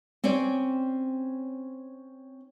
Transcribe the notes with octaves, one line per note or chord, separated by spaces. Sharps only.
C4 C#4 C#5 D5